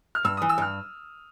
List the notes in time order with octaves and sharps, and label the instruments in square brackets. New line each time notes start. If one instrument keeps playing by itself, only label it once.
[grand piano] F6
[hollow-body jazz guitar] G2 [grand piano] E6
[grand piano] D#6
[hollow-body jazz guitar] E3
[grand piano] E6
[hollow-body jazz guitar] G2 [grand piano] F6